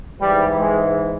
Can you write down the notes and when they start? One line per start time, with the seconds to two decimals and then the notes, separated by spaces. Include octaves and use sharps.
0.21 G#2 E3 G3
0.57 G#3